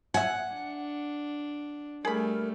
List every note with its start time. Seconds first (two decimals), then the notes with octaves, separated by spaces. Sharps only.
0.14 E5 F#5 G#5
0.52 D4
2.05 G3 A3 G#4 A#4 B5